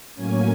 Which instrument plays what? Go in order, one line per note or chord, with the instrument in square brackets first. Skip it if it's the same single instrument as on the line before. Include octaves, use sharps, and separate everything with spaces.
[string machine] A2 F#3 A#3 C#4 G#5